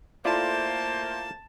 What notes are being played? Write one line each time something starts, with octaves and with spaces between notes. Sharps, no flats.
A3 A#3 E4 F4 C5 D5 A5